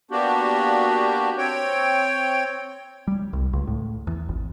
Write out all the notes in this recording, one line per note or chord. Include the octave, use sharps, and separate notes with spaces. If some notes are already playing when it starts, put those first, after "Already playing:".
A#3 B3 D4 F#4 G4
C4 C#5 G5
G3
C2
C#2
A2
E2
G#1